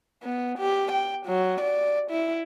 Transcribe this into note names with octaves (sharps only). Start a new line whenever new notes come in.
B3
G4
G5
F#3
D5
E4